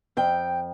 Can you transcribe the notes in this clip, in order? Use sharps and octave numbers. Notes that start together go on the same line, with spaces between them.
F2 G5